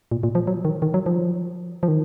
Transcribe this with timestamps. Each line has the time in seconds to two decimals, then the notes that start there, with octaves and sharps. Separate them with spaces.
0.11 A#2
0.23 A#2
0.35 F3
0.47 F#3
0.65 D#3
0.82 D#3
0.94 F#3
1.06 F3
1.83 F3
1.88 D#3